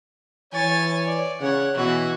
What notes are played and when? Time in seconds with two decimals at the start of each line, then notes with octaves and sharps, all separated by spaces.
0.54 E3 C#5 G#5 A6
1.05 D5
1.42 C#3 C#5 F#5
1.76 B2 E3 F#4